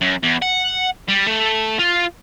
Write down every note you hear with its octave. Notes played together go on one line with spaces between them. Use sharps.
F#2
E2
F#5
G3
A3
F4